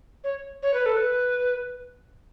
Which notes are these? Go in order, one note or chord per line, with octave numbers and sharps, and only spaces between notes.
C#5
C#5
B4
A4
B4